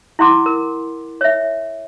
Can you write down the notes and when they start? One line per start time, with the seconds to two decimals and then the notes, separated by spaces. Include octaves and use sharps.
0.19 E4 F#5 C6 D6
0.46 A#4
1.21 C#5 E5